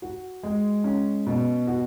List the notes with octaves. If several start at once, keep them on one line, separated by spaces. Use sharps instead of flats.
F#4
G#3
C#4
B2
F#4